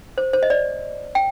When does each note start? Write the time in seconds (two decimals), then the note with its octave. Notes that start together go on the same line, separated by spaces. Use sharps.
0.18 C5
0.33 C5
0.43 D#5
0.50 D5
1.15 G5